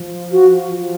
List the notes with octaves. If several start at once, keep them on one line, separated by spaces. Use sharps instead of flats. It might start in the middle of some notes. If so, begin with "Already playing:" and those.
Already playing: F3
F#4
F3